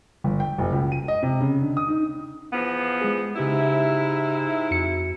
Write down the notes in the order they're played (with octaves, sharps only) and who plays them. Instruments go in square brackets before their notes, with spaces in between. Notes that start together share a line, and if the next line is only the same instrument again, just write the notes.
[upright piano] G1
G5
F#1
C#2
D#7
D#5
C3
C#3
D3
D#6
D#4
[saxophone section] E2 F3 B3
[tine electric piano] G#3 G#4
[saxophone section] G#2 E4 [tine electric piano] C#3 G4 E5
[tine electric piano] F2 F#4 C#7